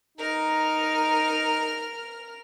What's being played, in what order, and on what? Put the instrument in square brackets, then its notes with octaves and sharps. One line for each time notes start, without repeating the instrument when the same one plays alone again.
[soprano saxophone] D#4 [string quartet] A#4 F6